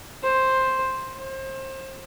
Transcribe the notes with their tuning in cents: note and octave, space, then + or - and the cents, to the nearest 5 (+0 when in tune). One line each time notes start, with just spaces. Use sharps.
C5 +5
C5 +30